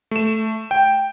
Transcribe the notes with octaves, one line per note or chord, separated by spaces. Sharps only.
A3 E7
G5